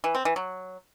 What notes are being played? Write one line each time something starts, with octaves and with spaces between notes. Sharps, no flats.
E3
C4
E3
F#3